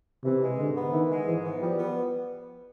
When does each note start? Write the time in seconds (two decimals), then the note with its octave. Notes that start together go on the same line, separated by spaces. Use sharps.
0.24 C3 E3
0.42 G#3
0.58 G#2 D3
0.76 B3
0.93 D#3 E3
1.10 G#3
1.27 G#2 E3
1.44 B3
1.61 F3 G3
1.79 B3